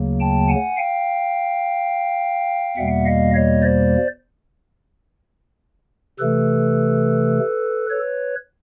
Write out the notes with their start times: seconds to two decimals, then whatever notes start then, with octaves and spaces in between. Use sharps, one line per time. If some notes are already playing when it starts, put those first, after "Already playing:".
Already playing: D2 C#3 F#3 A#3
0.20 G5 A5
0.49 F#5 G#5
0.77 F5 G5
2.77 E2 B2 G3 A#3 E5 F#5
3.06 D#5 F5
3.34 C#5 D#5
3.63 C5 D5
6.19 C3 E3 A3 A4 B4
7.90 B4 C#5